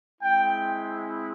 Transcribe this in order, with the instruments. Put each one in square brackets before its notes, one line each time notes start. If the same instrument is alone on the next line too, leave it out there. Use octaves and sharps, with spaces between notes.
[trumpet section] G#3 C4 E4 G5